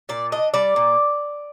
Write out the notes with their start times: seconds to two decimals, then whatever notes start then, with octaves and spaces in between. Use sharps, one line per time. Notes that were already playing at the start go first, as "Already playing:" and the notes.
0.09 A#2 D5
0.32 D4 D#5
0.54 G3 D5
0.76 A#2